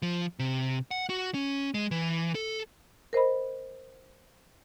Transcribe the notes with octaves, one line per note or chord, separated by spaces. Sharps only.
F3
C3
F#5
F#4
C#4
G#3
E3
A4
A#4 C5 D#5 B5